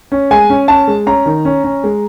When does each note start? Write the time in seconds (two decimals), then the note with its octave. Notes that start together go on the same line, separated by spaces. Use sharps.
0.12 C#4
0.31 G#3 G#5
0.50 C#4
0.68 C#4 A5
0.88 G#3
1.06 C#4 A#5
1.26 D#3
1.45 C#4
1.64 C#4
1.84 G#3